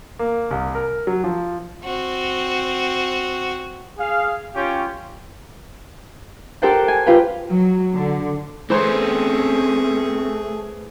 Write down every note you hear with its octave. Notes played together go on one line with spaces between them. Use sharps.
A#3
C2
A#4
F#3
F3
C4 F#4
G#4 F5
C#4 F4 G4 C#5 G5
G4 A4 A#4 C5 F#5 G5
G#5
F4 G4 B4 F5 G5
F#3
D3
E3 A3 C4 C#4 G#4 C5